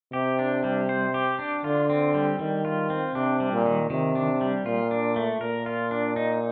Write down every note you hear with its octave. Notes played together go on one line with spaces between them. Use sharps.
C3 G4
D4
G3
C5
G4
D4
D3 F4
C4
G3
D#3 G3
F4
C4
C3 D4
G3
A#2
D#3
C3 D#3
D4
G3
A#2 F4
D4
A3
A#2 A#4
F4
D4
D#4